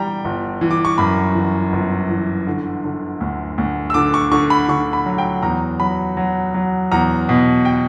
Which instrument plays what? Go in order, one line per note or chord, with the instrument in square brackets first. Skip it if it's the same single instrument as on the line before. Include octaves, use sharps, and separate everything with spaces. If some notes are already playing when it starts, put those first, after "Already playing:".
Already playing: [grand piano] E3 G3 G5 A#5
G1
E3
D6
C#6
F#2 B5
E3
G1
E3
D3
D3
D2
D2
E6
D3 D6
C#6
D3 C#6
B5
D3 C#6
B5
F#3
G5
E2 A#5
F#3 B5
F#3
F#3
E2 A#5
B2
G5